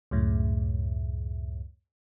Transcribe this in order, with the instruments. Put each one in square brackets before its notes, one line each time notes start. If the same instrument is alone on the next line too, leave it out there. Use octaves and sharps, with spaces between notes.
[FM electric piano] C#2 F#2 A2